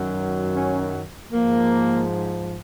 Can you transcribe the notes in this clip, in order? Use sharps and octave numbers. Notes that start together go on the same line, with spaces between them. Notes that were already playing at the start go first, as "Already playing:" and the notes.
Already playing: F#2 D#3 F#3
C#4
G#2 F3 A#3